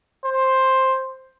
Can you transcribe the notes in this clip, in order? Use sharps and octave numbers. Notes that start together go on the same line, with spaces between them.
C5